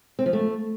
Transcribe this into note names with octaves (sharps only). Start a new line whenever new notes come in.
C4
F3
A3